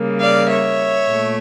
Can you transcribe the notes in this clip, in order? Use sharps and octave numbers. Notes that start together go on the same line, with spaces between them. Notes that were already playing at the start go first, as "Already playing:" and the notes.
Already playing: C#3 G3 A#3
D5 F5
C#5 E5
A#2 A3